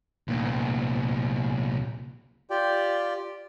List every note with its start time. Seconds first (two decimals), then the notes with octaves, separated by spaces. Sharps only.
0.28 C2 A#2
2.50 F4 G4 D5 G5